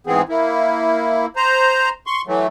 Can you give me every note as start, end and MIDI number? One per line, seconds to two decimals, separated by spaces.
0.07 0.22 44
0.07 0.22 52
0.07 0.22 59
0.07 0.22 60
0.07 0.22 68
0.29 1.26 58
0.29 1.26 64
1.36 1.89 72
1.36 1.89 82
2.06 2.21 84
2.06 2.21 85
2.27 2.47 52
2.27 2.47 54
2.27 2.47 57